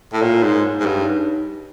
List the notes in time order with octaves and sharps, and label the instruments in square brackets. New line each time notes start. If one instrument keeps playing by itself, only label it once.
[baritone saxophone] A2
[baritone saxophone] A#2 [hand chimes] C#5
[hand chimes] D#4
[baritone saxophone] G#2
[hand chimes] G#4
D#4
[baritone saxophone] G#2
[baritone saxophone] G2 [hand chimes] C#5
[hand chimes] D#4